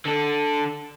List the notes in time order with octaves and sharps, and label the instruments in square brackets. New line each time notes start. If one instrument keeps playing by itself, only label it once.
[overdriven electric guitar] D3 A4